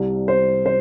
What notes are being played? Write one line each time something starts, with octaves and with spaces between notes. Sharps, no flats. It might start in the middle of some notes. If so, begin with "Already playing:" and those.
Already playing: C2 C3 G3
C5
C5